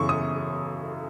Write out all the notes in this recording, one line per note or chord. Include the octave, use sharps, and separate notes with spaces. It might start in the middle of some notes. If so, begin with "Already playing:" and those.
Already playing: F#2 C#3 E3 C#6
D#6